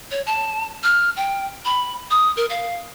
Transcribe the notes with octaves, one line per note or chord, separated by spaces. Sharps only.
C#5
A5
F6
G5
B5
D#6
A#4
F5